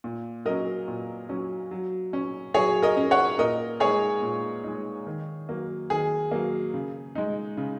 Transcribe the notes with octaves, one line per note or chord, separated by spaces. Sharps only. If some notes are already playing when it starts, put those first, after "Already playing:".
A#2
F#3 C#4 A#4 D#5
A#2
F#3 C#4
F#3
C#4
F#3 G#4 C#5
A#4 D#5
C#4
C#5 F#5
A#2 A#4 D#5
G#3 D#4 G#4 C#5
A#2
G#3 D#4
D#3
F#3 A#3
D#3 G#4
F#3 A#3
C#3
G#3 D#4
C#3